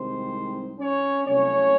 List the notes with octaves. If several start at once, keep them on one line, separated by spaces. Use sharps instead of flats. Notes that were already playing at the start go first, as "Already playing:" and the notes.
Already playing: C2 C3 D#3 G#3 C4 C5
C#4 C#5
C2 C3 F#3 A3 C#4 C#5